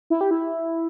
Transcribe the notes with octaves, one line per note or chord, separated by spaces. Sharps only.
E4
G4
E4